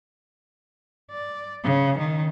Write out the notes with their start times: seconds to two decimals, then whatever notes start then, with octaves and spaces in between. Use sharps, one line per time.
1.11 D5
1.64 C#3
1.99 D#3